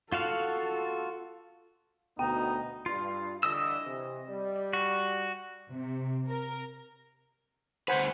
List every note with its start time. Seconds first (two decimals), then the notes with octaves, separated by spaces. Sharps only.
0.12 F4 F#4 A4 F5
2.19 D2 B2 B3 D#4 G5
2.86 G2 F4
3.43 D3 E3 G3 D#5 D#6 E6
3.84 C3 E3
4.28 G3 D5
4.73 F#4
5.71 C3
6.27 A#4
7.88 D2 B4 C5 F#5 G#5 B5